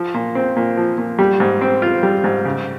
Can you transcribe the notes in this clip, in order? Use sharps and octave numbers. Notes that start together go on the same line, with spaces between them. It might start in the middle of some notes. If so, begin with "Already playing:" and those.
Already playing: F3
A#2
C4
A#2
F3
A#2
G3
G#2
C4
F4
G3
G#2
C#3